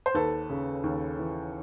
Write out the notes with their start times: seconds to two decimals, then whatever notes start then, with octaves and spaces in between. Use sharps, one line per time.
0.06 C5
0.14 D#2 A4 B4
0.50 C#3
0.84 D#2
1.19 E3